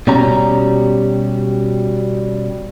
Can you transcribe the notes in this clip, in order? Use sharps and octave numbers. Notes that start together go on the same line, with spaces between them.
B2 G3 C#4 G4 A#5